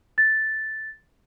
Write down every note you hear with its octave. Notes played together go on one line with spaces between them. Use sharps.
A6